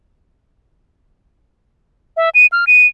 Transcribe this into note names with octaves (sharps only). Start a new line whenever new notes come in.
E5
D#7
F6
D#7